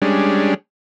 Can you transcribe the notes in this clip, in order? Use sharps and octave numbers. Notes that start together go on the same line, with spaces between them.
G3 G#3 C#4 D4